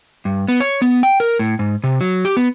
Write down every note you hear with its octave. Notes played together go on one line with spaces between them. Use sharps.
G2
B3
C#5
B3
G5
A#4
A2
G#2
C3
F#3
G4
B3